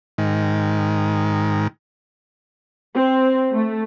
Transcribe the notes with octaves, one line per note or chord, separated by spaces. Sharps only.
G#2 D#3
C4
A3